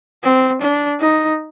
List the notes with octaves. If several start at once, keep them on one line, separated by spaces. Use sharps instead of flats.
C4
D4
D#4